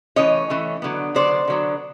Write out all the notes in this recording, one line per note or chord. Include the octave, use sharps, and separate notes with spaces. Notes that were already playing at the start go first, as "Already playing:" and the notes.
E3 A3 C#4 C#5 D#5
E3 A3 C#4
D3 F#3 B3
D3 F#3 B3 C5 D5
D3 F#3 B3